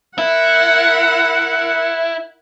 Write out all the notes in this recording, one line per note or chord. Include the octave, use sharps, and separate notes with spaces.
E4 A#4 F#5